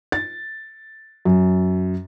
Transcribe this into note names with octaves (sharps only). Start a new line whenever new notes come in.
A6
F#2